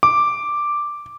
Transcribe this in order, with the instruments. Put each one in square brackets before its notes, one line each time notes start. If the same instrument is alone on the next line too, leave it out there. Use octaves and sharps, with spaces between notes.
[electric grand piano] D6